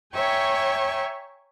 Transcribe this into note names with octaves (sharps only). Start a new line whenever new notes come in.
C#5 E5 G5 G#5 A#5 C#6